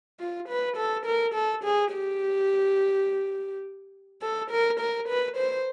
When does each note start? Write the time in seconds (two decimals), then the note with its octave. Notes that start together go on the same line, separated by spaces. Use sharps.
0.20 F4
0.49 B4
0.77 A4
1.06 A#4
1.35 A4
1.64 G#4
1.93 G4
4.22 A4
4.51 A#4
4.80 A#4
5.08 B4
5.37 C5